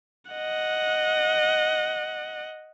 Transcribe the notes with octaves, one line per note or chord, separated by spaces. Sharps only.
D#5 F#5